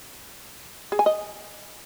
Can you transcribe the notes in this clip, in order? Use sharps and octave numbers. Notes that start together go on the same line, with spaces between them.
G#4
G#5
D#5